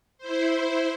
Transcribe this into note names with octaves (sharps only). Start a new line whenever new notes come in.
E4 C5